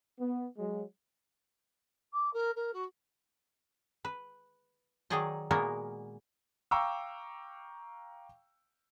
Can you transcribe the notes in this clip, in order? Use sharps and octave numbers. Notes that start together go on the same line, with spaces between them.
B3
F#3 G#3
D6
A#4
A#4
F#4
B4
D#3 F#3 D#4 G#4 D5 D#5
A#2 G#3 A#3 B3 F#4 A#4
F5 G5 A#5 C#6 D6 E6